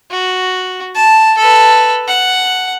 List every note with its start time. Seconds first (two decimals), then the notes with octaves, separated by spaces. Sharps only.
0.11 F#4
0.95 A5
1.38 A4 B4
2.08 F#5